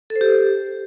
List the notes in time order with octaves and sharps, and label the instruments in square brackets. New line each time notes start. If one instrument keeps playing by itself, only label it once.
[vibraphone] A4
C5
G4